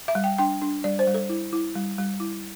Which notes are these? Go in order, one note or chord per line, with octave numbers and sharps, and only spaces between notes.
E5
G3
G5
D4 G5
D4
G3 D5
C5
G3
A4
E4
E4
G3
G3
E4